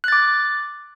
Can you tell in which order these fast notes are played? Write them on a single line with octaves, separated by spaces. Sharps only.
F#6 A6 D6